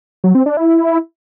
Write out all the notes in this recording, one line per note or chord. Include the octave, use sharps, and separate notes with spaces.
F#3
C4
D4
E4